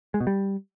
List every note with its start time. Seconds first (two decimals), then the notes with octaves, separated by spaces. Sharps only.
0.14 G#3
0.20 B2
0.27 G3